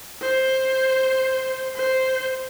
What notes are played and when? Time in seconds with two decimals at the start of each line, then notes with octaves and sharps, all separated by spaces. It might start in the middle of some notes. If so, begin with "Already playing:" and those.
0.21 C5
1.75 C5